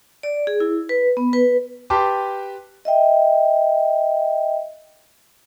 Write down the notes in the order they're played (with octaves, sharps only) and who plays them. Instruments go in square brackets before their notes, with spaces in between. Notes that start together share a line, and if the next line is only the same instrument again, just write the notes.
[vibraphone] D5
G#4
E4
B4
B3
B4
[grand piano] G4 B4 G5 A5 C6 D6
[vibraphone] D#5 E5 G5